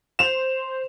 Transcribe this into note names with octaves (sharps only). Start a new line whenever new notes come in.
C5 E7 F7